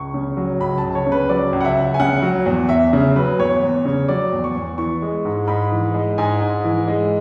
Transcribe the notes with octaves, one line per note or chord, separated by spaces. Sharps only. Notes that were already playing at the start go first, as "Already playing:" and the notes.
Already playing: C#2 C#6
C#3
F#3
C#2 B5
A5
C#2
C#5
C#3
B4
F#3 D5
C#2
F#5
E5
C#2
G#5
C#3 F#5
F#3
E2
E2 E5
C#3
F#3 B4
E2 C#5
E2
C#3
F#3 D5
E2
C#6
E2
E3 C#6
G#3
G#2
G#2 B5
E3
G#3
G#2 G#5
G#2
E3
G#3